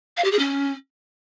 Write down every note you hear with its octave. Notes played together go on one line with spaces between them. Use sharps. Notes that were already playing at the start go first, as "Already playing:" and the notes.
F5
G4
G#4
C#4